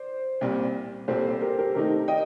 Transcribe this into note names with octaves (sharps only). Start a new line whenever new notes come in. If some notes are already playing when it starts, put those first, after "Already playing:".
Already playing: C5 D5
C2 A#2 G3 C4
C2 A#2 G3 C4 A4 C5
G4 A#4
G4 A#4
C3 D#3 A3 D#4 G4 A#4
D#5 G5